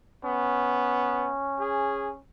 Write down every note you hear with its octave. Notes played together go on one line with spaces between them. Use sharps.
B3 C#4
G#4